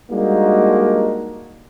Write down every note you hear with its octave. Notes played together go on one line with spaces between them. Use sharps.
G3 G#3 A#3 D4 D#4 F#4